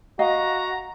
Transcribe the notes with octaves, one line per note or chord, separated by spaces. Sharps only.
F#4 D#5 F5 A#5